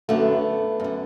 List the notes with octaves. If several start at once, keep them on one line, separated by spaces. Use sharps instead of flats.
F#2 D3 A3 B3
F#2 D3